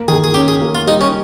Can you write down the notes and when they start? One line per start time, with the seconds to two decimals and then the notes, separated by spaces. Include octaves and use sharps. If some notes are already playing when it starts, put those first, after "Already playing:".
Already playing: A#3
0.08 D#3 G#4
0.24 G#4
0.34 C#4 G4
0.48 G#4
0.62 A#3
0.75 F4
0.87 G3 D#4
1.01 C#4